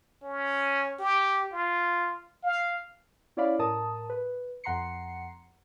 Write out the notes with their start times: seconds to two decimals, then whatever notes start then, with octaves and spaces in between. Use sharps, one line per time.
0.23 C#4
0.99 G4
1.53 F4
2.43 F5
3.37 C#4 E4 C#5 D5 F5 B5
3.59 A2 A#4 A5 D#6
4.10 B4
4.64 F2 F#5 A#5 C6 C7 C#7